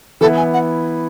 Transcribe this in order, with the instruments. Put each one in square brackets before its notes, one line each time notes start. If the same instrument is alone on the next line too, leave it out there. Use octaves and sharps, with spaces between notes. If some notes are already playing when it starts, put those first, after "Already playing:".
[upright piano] E3 B3 E4 [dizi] A4
[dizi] G#5
F#5